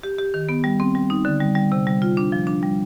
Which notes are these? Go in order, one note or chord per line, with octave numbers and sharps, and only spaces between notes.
G4
G4
D#3
B3
G3
C4
G3
D#4
D3
G3
G3
C3
G3
F4
D4
F3
D4
G3